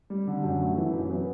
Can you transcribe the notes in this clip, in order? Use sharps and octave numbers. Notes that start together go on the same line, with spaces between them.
G3
D3
F#2
A3
E3
F#2
B3